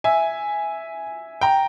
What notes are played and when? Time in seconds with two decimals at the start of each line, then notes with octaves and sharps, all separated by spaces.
0.04 E5 G#5
1.41 G5 A#5